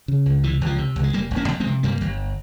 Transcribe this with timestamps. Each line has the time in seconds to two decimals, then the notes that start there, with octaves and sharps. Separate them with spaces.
0.08 C#3
0.26 C#2
0.43 C3 E3
0.61 C#2 F3
0.78 C3
0.96 C#2
1.03 G#3
1.13 F1 G3 A#3
1.31 F1
1.36 A#3 C#4
1.48 F2
1.60 G#3 C4
1.66 C3
1.83 G2 G3 A#3
2.01 G1